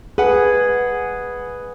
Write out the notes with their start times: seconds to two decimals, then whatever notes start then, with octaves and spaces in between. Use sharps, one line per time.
0.18 G#4 B4 F#5